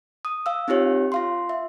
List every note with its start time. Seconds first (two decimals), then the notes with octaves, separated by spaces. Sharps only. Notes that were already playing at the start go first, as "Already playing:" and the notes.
0.25 D#6
0.46 F5 E6
0.68 C4 D#4 F4 G4 C#5
1.12 F4 F5 C6
1.49 E5